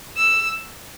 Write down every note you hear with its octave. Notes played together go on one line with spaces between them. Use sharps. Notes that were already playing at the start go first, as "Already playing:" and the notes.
E6